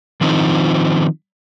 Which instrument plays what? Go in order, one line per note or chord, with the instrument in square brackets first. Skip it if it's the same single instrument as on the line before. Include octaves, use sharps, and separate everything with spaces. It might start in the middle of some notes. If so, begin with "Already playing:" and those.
[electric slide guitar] D#3 F3 C4 D#4 F4 C5